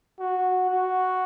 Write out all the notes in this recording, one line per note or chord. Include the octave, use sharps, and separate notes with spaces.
F#4
F#4